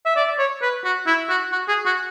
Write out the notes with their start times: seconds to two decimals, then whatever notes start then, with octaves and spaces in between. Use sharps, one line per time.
0.06 E5
0.16 D5
0.39 C#5
0.62 B4
0.84 F#4
1.07 E4
1.29 F#4
1.52 F#4
1.69 G#4
1.86 F#4